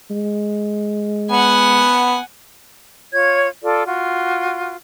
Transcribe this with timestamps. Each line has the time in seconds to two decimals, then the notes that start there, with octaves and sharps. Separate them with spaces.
0.11 G#3
1.31 B3 F#5 G#5
3.12 F4 C#5 G#6
3.62 F4 A4 D5
3.85 F4 F#4